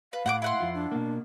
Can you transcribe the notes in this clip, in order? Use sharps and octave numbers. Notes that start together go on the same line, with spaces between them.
B4 F5
A2 F#5 G5 D6
E4 F#5 C6
F2 F4
D4
B2 A#3